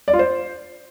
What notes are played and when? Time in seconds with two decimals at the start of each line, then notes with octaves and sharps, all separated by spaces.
0.08 D5
0.13 F4
0.19 C5